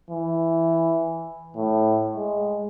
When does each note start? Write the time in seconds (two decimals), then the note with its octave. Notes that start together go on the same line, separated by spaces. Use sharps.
0.10 E3
1.56 A2
2.16 G#3